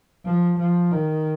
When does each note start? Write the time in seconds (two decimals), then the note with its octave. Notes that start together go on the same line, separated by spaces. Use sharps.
0.25 F3
0.58 F3
0.91 D#3